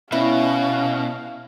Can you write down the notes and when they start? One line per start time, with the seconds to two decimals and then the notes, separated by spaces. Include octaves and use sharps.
0.12 B2 C#4 E4 F5